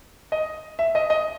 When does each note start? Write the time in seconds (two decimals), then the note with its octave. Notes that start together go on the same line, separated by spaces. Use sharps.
0.32 D#5
0.79 E5
0.95 D#5
1.10 D#5